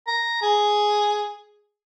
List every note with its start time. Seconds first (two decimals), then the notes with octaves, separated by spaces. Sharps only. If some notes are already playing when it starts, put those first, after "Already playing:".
0.07 A#5
0.42 G#4